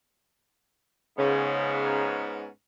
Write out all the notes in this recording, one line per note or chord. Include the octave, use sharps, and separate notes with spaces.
G#2 C#3 B3 C#4